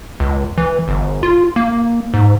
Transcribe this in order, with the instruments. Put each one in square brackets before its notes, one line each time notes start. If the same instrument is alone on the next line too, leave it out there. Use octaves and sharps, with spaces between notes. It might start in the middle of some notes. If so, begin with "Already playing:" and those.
[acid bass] C#2
E3
G1
F4
A#3
G#2